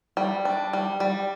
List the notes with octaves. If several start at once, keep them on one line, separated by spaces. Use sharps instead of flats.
G3
D4
G3
G3